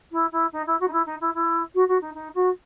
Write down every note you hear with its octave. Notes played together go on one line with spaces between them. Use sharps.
E4
E4
D#4
E4
F#4
D#4
E4
D#4
E4
E4
F#4
F#4
D#4
D#4
F#4